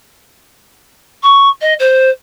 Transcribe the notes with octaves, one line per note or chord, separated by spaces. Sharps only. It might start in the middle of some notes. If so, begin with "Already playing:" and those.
C#6
D#5
C5